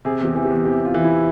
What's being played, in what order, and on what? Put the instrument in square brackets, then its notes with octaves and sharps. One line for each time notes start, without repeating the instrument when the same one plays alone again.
[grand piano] C3 [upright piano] G#4
[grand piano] E2 [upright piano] G4
[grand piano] E3
[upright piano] G4
[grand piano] E2
[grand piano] C3 [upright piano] G4
[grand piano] E2 [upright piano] F4
[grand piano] E3
[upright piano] E4